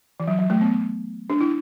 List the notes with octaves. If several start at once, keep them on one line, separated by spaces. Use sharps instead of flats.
E3
F#3
F#3
A3
B3
D4
E4